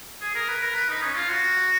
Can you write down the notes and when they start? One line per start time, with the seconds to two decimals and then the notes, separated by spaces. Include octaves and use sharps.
0.21 G#4
0.35 A#4
0.48 B4
0.62 A#4
0.75 B4
0.89 D#4
1.02 C#4
1.15 F4
1.29 F#4